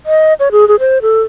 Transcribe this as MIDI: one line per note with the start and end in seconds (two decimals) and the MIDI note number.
0.06 0.34 75
0.40 0.49 73
0.52 0.68 68
0.68 0.76 68
0.80 0.98 72
1.02 1.22 69